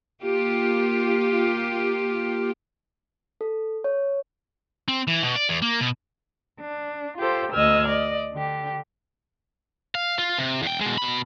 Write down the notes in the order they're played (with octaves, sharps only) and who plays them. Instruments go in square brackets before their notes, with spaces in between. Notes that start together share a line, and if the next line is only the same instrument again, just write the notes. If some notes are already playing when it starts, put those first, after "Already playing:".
[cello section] A#3 F4 G4
[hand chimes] A4
C#5
[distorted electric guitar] C4
E3
B2
D5
E2
A#3
B2
[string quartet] D4
F4 G4 A4 C5
D2 D#5 E6 F6 G#6
D5 D#5
D3 G4
[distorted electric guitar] F5
F4
C3
E2 G5
B2 G#3
B2 B5